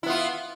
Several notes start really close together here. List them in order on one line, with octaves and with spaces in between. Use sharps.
E4 B3 F4